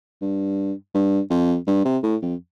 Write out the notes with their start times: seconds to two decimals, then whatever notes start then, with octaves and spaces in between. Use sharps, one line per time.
0.22 G2
0.94 G2
1.31 F2
1.67 G2
1.85 C3
2.03 A2
2.22 F2